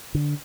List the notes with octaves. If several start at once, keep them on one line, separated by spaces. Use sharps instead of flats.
D3